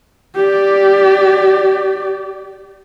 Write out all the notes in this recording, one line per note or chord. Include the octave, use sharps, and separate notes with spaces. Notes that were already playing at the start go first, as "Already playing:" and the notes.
G4 D5